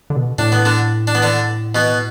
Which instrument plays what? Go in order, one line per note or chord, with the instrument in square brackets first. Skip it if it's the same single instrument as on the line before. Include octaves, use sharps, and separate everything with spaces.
[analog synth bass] D3
B2
[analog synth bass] A2 [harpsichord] D4
[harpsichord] B3
D3 D4
D4
B3
D3 D4
B2 B3